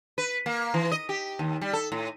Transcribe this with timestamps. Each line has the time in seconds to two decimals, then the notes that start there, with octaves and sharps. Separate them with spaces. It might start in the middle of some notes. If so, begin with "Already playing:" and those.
0.18 B4
0.46 A#3
0.74 E3
0.91 D#5
1.09 G4
1.39 D#2
1.61 G3
1.73 A4
1.92 A2